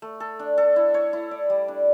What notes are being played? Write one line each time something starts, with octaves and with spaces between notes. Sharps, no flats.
A3
A4
D4
A4
E4
C#5
E4
D5
G3
D4